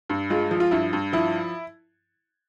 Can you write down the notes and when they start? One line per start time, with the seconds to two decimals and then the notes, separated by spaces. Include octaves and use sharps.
0.10 G2
0.30 G#3 F4
0.51 F3
0.60 F4
0.71 G2 E4
0.93 G2
1.13 F3 E4